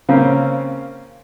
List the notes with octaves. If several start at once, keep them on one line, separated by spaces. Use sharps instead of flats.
C#3 A#3 C4 C#4